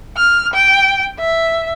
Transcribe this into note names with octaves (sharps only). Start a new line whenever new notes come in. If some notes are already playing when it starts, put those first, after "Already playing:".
F6
G5
E5